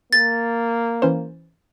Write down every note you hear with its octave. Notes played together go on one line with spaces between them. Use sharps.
A#3 A6
E3 C#4 C5